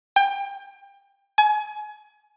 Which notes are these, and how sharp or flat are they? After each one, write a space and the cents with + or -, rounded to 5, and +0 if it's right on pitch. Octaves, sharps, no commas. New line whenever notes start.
G5 +25
G#5 +30